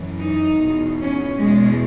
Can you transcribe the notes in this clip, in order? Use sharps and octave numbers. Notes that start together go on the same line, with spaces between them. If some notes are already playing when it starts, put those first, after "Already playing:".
Already playing: F#2 E3
D#4
E2 B2
C#4
E2 B2 G#3